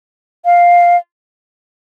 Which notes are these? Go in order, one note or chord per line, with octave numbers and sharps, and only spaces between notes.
F5